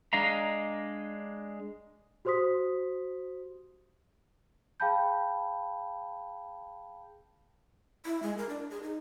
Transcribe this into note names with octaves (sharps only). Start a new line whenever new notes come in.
G#3 D4 D#5 F5 A#5
F#4 G4 C5 C6 D#6 B6
G#4 F5 G5 A5 B5 G6
E4
G#3
A#4
D4
G#4
D#4